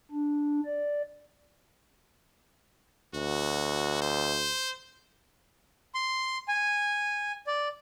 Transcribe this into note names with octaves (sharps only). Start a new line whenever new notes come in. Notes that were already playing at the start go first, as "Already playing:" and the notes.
D4
D5
D2 F#4
C5
C6
G#5
D5